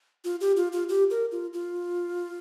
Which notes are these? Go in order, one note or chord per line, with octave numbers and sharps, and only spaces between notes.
F4
G4
F4
F4
G4
A#4
F4
F4